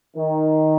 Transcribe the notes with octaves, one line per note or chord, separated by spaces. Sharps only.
D#3